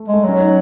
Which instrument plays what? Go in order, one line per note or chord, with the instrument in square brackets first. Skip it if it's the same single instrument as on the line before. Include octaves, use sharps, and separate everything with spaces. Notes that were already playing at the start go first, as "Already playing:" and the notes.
Already playing: [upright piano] A3
[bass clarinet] G#3
[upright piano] A3
[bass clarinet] F#3 [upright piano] C#4
[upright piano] D#4